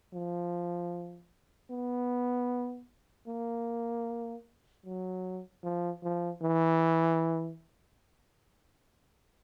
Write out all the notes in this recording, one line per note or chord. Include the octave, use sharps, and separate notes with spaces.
F3
B3
A#3
F#3
F3
F3
E3